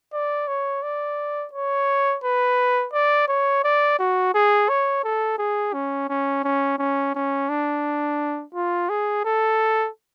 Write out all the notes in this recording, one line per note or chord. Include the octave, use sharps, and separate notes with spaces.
D5
C#5
D5
C#5
B4
D5
C#5
D5
F#4
G#4
C#5
A4
G#4
C#4
C#4
C#4
C#4
C#4
D4
F4
G#4
A4